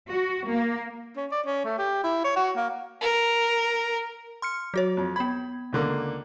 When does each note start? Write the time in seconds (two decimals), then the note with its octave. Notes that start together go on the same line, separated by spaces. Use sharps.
0.11 F#4
0.49 A#3
1.17 C#4
1.32 D5
1.46 C#4
1.65 A3
1.78 G4
2.04 E4
2.24 C#5
2.36 F#4
2.56 A#3
3.01 A#4
4.42 C6 F6 C#7
4.74 F#3 F#4 C#5
4.97 F2
5.16 B3 B5 G#6
5.73 C#2 D3 A#3